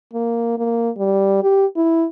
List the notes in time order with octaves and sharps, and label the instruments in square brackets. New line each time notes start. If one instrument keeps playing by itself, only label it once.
[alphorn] A#3
A#3
G3
G4
E4